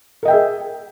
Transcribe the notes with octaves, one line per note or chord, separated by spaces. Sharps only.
G#4 A#4 D#5 E5 G5